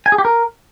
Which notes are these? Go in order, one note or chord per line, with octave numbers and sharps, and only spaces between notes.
G#5
G#4
G4
A#4